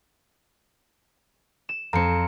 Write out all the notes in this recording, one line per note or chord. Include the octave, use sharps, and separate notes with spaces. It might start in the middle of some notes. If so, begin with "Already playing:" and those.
E7
F2 C4 A#5 C#7